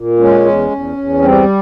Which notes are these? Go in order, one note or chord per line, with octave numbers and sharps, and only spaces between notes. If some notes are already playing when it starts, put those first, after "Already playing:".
Already playing: A#2
G#3 C#4
E2
E2
E2
G3 C4